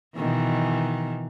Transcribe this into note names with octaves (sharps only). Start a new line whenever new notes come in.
B2 D#3 E3